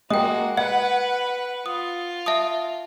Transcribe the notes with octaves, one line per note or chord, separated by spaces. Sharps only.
G#3 A#3 F#4 G5 D#6
B4 D#5 F#5
F4 D#6
E5 A5 D#6